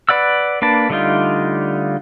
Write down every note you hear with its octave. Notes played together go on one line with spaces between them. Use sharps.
B4 D5 F#5 E6
A#3 D4 B4 A5
D3 G3 A3 D#4 F4